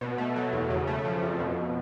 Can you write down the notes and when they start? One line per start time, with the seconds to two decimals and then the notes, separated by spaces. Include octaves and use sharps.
0.01 B2
0.18 A3
0.36 F#3
0.53 E2
0.70 C#3
0.87 A3
1.05 F3
1.22 F2
1.39 B2